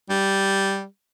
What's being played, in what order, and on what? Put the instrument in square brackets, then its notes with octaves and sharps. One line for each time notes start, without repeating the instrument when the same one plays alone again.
[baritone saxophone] G3